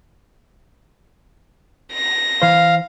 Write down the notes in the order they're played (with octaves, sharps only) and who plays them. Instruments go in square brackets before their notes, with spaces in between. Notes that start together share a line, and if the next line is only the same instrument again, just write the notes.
[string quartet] A#6
[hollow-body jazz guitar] E3 C5 [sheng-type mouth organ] F5